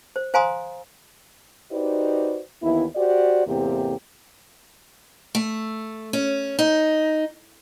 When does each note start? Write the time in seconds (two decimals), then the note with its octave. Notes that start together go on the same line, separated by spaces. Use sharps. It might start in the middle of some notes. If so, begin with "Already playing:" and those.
0.16 C5
0.34 C5 F5 G#5 A#5 C6 D#6
1.71 D#4 F#4 G4 B4 C5 D5
2.62 D#2 E3 B3 E4
2.96 F#4 G4 C5 D5
3.47 E2 A2 C3 A#3 C4 G4
5.35 A3
6.13 C#4
6.59 D#4